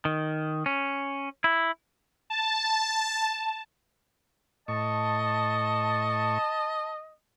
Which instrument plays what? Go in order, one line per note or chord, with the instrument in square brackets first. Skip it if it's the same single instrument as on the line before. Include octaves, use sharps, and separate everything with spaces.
[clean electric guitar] D#3
C#4
E4
[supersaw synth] A5
[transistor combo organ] A2 C#6 [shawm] D#5 [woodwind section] A5